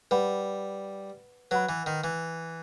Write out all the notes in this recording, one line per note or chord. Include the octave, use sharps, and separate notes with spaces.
G3 B4 F#5 B5
F#3 B4 F#5 B5
E3
D#3
E3